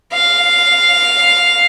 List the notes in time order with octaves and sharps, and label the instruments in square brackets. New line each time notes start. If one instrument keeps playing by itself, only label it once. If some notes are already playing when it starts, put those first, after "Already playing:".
[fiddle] F5